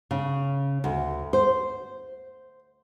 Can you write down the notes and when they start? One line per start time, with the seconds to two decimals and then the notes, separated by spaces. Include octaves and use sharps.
0.11 C#3
0.84 D2
1.33 C5